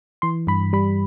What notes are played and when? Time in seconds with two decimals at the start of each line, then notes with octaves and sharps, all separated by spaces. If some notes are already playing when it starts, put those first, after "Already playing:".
0.22 E3 C6
0.47 G2 B5
0.73 G3 B5